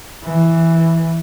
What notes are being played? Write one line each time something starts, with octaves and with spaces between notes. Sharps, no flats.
E3